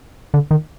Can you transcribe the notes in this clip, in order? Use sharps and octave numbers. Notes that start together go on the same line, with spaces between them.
D3
D#3